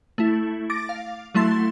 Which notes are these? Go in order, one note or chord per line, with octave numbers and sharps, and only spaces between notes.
A3 E4
D6 A6 A#6 D7
F5
F#3 A3 E4 C6 A6